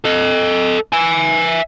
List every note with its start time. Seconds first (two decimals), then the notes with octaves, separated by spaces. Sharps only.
0.04 A4 D#5
0.92 E5 G#5